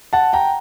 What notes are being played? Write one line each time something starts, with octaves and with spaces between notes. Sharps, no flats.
F#5 A5
G5 A#5